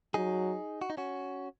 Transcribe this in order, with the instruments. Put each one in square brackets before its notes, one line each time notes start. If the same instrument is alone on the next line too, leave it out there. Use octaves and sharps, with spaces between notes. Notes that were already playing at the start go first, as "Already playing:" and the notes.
[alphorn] F#3 [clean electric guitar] D#4 G#4
[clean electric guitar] F#4
D#4
C#4 F#4